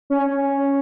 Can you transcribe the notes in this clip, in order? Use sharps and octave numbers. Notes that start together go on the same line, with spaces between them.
C#4